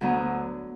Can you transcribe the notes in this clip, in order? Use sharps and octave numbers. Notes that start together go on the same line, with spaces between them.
D2 D3 F#3 B3